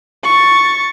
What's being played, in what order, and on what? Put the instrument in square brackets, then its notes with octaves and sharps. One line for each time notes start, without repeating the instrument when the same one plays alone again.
[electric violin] C#6 A6